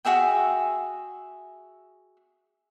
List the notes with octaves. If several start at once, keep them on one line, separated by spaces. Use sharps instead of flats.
F#4 G#4 E5 G5